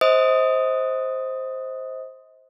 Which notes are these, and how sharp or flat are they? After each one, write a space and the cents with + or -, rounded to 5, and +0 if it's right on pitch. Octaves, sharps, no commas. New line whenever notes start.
C5 +0 D#5 +40 D#6 +0